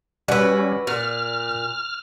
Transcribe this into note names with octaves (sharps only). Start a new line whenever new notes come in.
G3 C#4 F#4 B4 D5 E6
A#2 F6